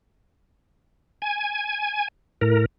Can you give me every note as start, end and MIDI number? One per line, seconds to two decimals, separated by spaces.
1.22 2.08 80
2.41 2.65 45
2.41 2.65 70